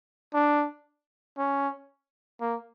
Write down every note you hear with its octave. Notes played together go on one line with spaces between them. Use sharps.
D4
C#4
A#3